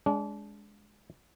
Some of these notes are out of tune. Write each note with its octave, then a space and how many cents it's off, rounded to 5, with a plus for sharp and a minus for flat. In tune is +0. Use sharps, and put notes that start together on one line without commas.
G#3 +0 D4 -30